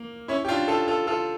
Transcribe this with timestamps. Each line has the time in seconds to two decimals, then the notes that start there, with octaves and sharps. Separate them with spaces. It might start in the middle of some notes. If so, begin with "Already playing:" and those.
Already playing: A#3
0.28 C#4 E4
0.45 G4
0.49 D4 F4
0.68 F4 A4
0.88 F4 A4
1.07 F4 A4